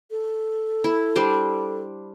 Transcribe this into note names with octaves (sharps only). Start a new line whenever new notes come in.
A4
E4
G3 D4 C5